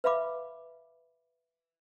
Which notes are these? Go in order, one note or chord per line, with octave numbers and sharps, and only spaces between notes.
B4 E5 F5 B5 D6